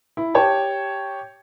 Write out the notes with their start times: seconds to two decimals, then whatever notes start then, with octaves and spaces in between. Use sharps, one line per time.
0.17 E4
0.34 G4 C#5 G5 A5